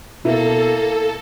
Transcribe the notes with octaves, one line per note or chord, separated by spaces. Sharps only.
B2 A#3 E4 A4